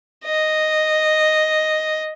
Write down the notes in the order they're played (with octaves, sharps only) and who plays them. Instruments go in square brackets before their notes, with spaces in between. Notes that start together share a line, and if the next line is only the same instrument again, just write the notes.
[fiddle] D#5